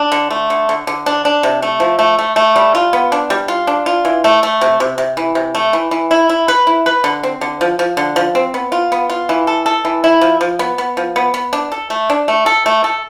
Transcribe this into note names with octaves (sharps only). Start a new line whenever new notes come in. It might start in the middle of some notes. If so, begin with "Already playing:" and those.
Already playing: D4
D3
A3
D3
D3
D3
D4
D4
C3
A3
F3
A3
A3
A3
G3
F4
B3
D4
G3
F4
D4
F4
E3
A3
A3
C3
C3
C3
E3
C3
A3
E3
E3
E4
E4
B4
E4
B4
D3
C4
D3
F3
F3
D3
F3
C4
B3
F4
B3
F4
E3
A4
A4
E3
E4
F3
F3
B3
B3
F3
B3
B3
D4
A4
A3
D4
A3
A4
A3
A4